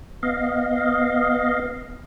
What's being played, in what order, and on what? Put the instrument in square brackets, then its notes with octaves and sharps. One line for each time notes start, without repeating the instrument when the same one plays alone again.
[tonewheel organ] B3 D#5 F5